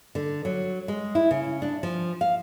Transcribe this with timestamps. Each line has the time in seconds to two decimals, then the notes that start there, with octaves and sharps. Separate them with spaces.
0.15 D3
0.45 F#3
0.88 G#3
1.15 E4
1.31 C#3
1.62 D4
1.83 F3
2.21 F5